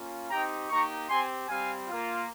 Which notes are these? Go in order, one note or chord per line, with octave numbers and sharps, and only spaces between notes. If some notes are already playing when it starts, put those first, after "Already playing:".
Already playing: A#3 C#4 F4
C4 D#4 G4 G5 A#5
A#3 D#4 G4 A#5 C#6
C4 G4 G#5 C6
G3 C4 G4 F5 G#5
A#3 F4